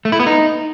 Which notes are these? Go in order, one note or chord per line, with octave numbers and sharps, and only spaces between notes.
A3
E4
B3
D#4